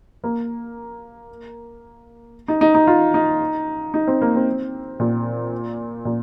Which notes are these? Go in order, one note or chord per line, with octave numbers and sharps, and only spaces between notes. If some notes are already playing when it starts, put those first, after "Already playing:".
A#3
D#4
D#4
D#4
F4
D#4
D#4
C4
A#3
C4
A#2
A#2